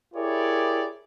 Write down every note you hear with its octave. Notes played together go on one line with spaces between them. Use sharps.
E4 G4 G#4 A#4 C#5 D5